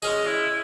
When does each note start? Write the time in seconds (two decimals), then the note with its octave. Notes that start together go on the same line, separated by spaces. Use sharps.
0.03 G#3 C#4 G#4 D#5
0.27 E4